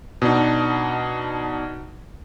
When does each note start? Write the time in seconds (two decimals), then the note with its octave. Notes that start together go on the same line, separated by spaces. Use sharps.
0.22 B2 D4 D#4